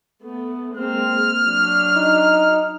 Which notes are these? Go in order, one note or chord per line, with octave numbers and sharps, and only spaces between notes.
A3 B3
G#3 A#3 C4 F6
F#3 D4
D#4